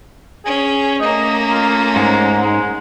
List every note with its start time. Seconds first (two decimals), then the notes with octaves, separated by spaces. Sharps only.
0.45 C#4 G#4
1.00 A3 A#3 C#4 D#5
1.52 F4
1.96 G#2 G#3
2.38 G#3